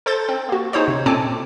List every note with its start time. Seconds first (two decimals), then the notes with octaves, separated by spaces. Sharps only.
0.06 A4 C5 G6 A6
0.29 C4
0.49 A#3 F#4
0.73 D#4 G#4 C5 C#5
0.88 C3
1.06 A#2 C4 A4 G#5 A5 D6